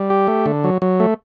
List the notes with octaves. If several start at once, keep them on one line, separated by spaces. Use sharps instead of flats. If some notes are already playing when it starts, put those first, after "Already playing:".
Already playing: G3
G4
A3
D3
F#3
F#3
A3